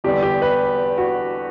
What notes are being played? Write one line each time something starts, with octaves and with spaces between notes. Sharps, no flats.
E2 D3 G3 B3 D4 G4
G4
B4
F#4